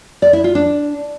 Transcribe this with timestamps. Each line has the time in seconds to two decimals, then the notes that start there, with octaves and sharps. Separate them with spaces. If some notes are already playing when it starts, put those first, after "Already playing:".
0.22 D5
0.33 E4
0.44 F4
0.55 D4